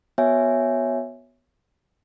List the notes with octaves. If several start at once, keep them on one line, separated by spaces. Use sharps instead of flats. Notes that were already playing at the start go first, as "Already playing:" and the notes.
B3 F#4 C#5 E5 G#5